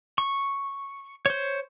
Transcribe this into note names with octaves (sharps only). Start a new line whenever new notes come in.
C#6
C5 C#5